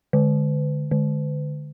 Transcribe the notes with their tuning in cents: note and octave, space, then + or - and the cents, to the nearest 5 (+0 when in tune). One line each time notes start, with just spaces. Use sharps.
D3 +10
D3 +15